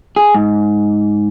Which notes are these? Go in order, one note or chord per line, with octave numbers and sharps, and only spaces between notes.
G#4
G#2